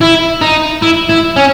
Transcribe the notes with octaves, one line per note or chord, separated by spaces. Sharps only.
E4
D#4
E4
E4
C#4